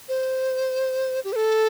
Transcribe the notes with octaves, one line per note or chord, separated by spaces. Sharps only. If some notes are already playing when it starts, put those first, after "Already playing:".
C5
G4
C5
A4